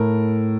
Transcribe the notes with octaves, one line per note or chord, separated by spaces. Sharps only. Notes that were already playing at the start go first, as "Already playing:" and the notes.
Already playing: A2 A#4